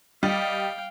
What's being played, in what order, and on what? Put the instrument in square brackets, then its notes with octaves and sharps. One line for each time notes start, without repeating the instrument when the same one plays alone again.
[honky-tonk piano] G3 [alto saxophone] D#5 [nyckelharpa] F5 G5